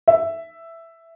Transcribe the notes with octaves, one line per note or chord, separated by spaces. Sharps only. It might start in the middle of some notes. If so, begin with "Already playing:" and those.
E5